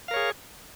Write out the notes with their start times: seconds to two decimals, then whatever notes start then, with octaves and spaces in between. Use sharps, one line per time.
0.08 F5
0.11 A#4
0.14 C#5
0.16 G#4